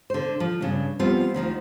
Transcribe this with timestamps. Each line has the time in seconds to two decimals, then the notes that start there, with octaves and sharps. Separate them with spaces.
0.10 D3 C5
0.40 F3
0.61 G2 C#3 D4
0.99 F3 G3 B3 C4 F4
1.34 D2 D#3 F3 D#4